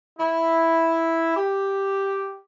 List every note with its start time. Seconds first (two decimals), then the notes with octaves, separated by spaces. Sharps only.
0.18 E4
1.35 G4